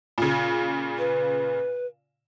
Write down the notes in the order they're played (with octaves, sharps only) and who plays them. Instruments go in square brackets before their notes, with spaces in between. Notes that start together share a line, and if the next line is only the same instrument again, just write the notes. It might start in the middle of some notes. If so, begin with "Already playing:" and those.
[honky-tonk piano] A#2 C#3
[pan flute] B4